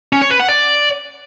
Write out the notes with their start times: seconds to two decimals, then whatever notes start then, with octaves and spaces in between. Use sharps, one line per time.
0.13 C#4
0.22 C#5
0.31 B4
0.40 F#5
0.49 D5